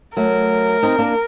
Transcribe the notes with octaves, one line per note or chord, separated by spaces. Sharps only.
F#3 A3 A#4
C4 D#4
A#3 D4